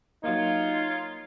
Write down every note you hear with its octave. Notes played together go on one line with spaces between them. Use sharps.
F#3 A#3 D#4 F4 C#5